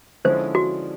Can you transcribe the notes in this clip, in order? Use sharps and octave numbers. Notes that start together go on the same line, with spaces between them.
D3 F3 G#3 C#4 E4 C5
F#4